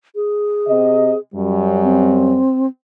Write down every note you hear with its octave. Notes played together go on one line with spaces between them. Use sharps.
G#4
C3 D#5
F#2 G3
C4